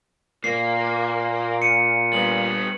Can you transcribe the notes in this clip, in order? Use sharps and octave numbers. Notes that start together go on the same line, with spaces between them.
A#2 A#3 C7
C#7 D#7
G3 B3 F#7